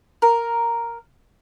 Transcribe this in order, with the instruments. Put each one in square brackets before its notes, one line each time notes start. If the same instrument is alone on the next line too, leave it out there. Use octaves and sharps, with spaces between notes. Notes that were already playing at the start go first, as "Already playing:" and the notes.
[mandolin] A#4